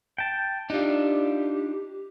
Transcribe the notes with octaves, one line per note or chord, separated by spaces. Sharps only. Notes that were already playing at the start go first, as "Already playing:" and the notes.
G5 A5
D4 D#4 F4 G4